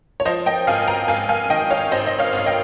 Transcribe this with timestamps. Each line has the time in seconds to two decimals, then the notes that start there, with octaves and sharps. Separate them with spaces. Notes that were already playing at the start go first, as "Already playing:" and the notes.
0.20 C#5
0.25 F3 C5 D#5
0.46 D#5 G5
0.67 G#1 F5 G#5
0.88 G5 A#5
1.08 G#1 F5 G#5
1.29 F5 G#5
1.50 D#3 D#5 G5
1.70 C#5 F5
1.91 G#1 C5 D#5
2.07 D#5
2.19 C#5 F5
2.33 G#1 F5
2.46 D#5 G5